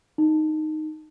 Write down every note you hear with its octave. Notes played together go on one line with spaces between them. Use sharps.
D#4